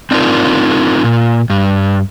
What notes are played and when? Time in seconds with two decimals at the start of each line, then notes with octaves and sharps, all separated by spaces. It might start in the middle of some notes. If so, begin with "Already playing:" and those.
0.11 C4 D4 D#4 F4 A#4
1.04 A#2
1.50 G2